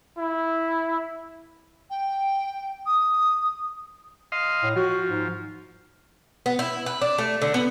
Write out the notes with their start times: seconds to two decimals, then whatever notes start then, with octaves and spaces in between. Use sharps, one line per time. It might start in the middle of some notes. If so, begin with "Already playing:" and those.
0.18 E4
1.90 G5
2.86 D#6
4.32 D#5 F5 C6
4.63 A2
4.76 F3 F#4
5.09 G#2
6.46 B3
6.59 E4
6.86 B4
7.01 D4
7.18 A3
7.42 D3
7.54 B3